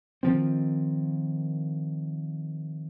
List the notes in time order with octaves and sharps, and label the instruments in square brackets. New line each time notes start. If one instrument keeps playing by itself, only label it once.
[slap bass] D#3 F3 C4